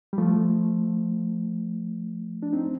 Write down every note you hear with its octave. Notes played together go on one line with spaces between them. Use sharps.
G3
F3 A3
D4
C4 D#4